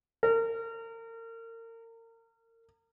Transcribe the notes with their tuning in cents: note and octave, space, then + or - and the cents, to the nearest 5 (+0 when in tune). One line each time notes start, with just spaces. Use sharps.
A#4 -35